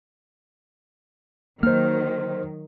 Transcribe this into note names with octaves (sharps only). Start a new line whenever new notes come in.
D#3 F#3 A#3 C5 F6